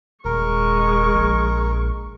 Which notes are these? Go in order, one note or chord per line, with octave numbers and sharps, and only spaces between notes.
D#1 G#3 A#4 C#6
A#1